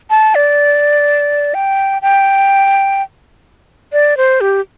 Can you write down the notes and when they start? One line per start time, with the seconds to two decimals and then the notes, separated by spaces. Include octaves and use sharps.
0.10 A5
0.35 D5
1.54 G5
2.02 G5
3.93 D5
4.17 C5
4.41 G4